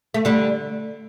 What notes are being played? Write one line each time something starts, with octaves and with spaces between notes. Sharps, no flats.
A3
D3 G3